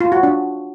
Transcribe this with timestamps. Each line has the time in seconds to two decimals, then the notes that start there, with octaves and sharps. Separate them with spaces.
0.01 F4
0.12 F#4
0.23 D4